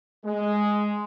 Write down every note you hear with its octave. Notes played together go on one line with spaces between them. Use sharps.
G#3